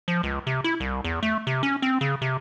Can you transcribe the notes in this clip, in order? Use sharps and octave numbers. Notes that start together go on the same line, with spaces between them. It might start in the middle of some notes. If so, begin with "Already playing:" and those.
F3
C#2
C3
E4
C2
E2
A3
C3
C#4
C4
C#3
C3